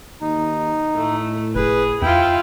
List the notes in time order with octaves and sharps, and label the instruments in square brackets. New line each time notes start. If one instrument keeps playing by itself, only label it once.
[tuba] D#2 [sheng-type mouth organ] D#4
[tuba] A2 [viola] A3
[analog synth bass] G1 [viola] G#4 [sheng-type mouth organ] B4
[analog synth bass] F2 [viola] E4 F4 [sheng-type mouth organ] G5